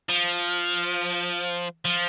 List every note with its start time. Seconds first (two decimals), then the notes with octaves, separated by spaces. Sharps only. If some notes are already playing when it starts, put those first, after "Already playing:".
0.09 F3
1.85 F3